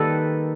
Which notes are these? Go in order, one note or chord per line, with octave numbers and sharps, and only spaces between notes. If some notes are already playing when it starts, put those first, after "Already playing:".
Already playing: D#3 G3 A#3 A4 B4